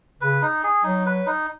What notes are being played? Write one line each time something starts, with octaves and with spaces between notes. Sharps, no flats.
C#3 B4
D#4
G#4
F#3 D#4
B4
D#4